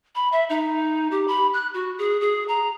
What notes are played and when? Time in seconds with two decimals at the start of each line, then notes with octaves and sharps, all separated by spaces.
0.15 B5
0.32 E5
0.50 D#4
1.11 G4
1.28 B5
1.54 F#6
1.74 F#4
1.98 G#4
2.21 G#4
2.48 A#5